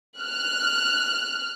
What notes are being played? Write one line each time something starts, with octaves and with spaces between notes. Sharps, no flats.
F6 F#6